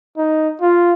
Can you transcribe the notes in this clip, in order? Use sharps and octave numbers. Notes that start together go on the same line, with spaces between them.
D#4
F4